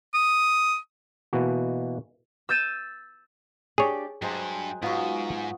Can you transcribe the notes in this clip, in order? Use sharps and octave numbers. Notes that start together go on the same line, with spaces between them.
D#6
B2 E3 A#3 F#4
E6 G6 A6 D#7 E7
D4 G4 G#4 C#5 D5
G2 F#3 G#3 C5 G#5
G#2 F#3 B3 F4